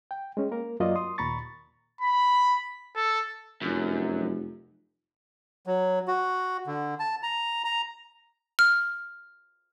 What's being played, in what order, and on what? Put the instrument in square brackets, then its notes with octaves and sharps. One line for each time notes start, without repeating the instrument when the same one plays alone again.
[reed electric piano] G5
G#3 C#4
A#3 A#4
F#2 F#3 A#3 F4 D5 D#5
C6 D#6
D#2 A#2 A#5 B5 C#6 A6
[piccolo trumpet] B5
A4
[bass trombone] F1 [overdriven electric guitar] F#2
[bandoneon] F#3
F#4
D3
A5
A#5
A#5
[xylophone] F6